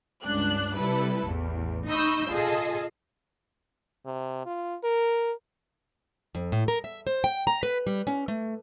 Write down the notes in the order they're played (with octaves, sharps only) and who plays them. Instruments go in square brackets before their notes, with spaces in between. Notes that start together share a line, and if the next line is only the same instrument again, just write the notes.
[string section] C#2 G2 D4 F#6
C3 G3 E4 A4 B4
A1 E2
D#4 D#5 B5 C#6 E6 G6
F4 G#4 A4 D#5
[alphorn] C3
F4
A#4
[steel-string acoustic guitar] F2
A2
A#4
E5
C5
G5
A#5
B4
G3
C#4
A3